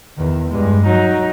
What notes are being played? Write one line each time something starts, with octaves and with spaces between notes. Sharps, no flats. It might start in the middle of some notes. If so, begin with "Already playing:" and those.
E2 D#3
G2 G#3
F#3 D#4